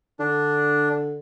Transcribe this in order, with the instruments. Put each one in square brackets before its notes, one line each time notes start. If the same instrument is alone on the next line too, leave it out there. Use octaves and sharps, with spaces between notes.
[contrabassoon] D3 [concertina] D4